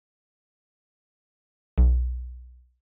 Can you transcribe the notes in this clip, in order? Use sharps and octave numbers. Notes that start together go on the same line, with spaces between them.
B1